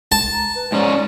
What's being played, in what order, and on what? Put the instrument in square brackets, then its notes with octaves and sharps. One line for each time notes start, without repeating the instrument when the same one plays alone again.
[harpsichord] A5
[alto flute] A#5
B4
[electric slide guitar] G#2 C#4 [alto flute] D5